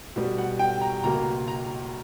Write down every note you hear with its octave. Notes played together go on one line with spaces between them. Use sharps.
B2 G3 B3
F#5
G5
A#5
C#2 B2 A#3 A#5
A#5